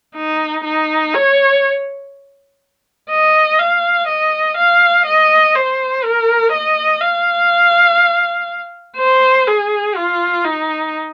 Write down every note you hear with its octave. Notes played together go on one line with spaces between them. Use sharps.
D#4
D#4
C#5
D#5
F5
D#5
F5
D#5
C5
A#4
D#5
F5
C5
G#4
F4
D#4